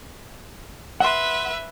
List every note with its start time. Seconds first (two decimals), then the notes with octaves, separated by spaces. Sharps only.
1.00 B4 E5 F#5 C6